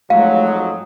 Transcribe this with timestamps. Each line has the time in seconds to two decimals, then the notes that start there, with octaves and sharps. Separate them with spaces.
0.10 F2 G#2 F#3 G#3 A3 F5
0.47 D#6